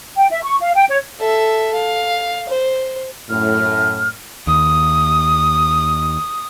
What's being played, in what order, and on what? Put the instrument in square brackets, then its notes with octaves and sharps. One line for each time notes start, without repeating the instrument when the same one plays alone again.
[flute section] G5
E5
C#6
F5
G5
C#5
[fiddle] A4 E5
F5
C5
[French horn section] F#2 A2 [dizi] F6
[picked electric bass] D#2 [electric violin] D#6